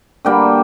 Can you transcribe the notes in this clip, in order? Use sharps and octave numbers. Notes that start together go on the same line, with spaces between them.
D3 G3 A#3 G5